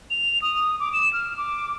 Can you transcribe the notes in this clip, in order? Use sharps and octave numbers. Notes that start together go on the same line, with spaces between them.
F7
D#6
D6
E7
F6
D6